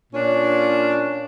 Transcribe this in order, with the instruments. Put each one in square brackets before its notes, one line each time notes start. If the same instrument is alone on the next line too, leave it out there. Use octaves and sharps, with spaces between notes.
[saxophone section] A#2 C#4 D4